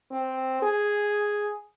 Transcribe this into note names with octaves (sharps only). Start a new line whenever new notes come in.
C4
G#4